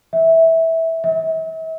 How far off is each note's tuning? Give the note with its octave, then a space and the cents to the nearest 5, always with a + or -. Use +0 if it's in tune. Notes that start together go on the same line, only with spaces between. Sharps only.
E5 -15
E5 -40